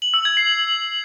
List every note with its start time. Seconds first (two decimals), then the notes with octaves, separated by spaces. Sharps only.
0.02 F#7
0.14 E6
0.25 G#6
0.37 C7